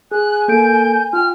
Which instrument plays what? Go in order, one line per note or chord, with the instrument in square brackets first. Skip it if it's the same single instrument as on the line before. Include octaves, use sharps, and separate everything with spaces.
[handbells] G#4 [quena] G#5 [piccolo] F#6
[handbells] A#3 A4 D7 [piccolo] G6
[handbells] F4 G5 [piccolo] F6